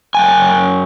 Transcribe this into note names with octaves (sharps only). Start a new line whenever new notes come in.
F#2 G5 G#5